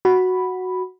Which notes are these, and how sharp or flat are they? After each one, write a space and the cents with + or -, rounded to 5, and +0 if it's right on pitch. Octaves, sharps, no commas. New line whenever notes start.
F#4 +0 B5 +0